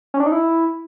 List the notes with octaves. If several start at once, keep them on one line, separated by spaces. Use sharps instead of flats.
C#4
D4
D#4
E4